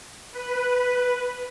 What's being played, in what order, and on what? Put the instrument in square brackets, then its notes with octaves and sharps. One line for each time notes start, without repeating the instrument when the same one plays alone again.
[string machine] B4